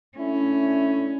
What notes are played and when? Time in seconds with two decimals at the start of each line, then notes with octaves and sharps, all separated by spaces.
0.17 A3 C#4 D4 E4